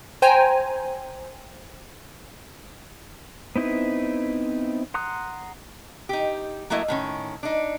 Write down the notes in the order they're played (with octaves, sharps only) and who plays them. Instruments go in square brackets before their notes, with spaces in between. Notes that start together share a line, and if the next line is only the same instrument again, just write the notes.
[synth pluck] C5 G5 G#5 A#5
[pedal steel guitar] B3 C4 D#4 E4 B4
F#5 A#5 C6 D#6 F#6
[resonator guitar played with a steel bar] D#4 G4
F#3 A3 A#3 E4 D#5
A2 D#3 C#4
D4 D#4